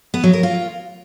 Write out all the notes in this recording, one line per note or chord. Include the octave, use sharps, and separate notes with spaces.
B3
F#3
A#4
F4